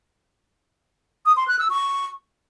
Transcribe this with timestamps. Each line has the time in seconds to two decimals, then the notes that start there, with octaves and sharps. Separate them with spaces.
1.26 D#6
1.37 C6
1.48 F#6
1.59 E6
1.70 C#6